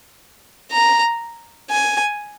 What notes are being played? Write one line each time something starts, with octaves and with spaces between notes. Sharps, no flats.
A#5
G#5